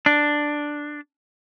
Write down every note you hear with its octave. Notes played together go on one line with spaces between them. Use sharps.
D4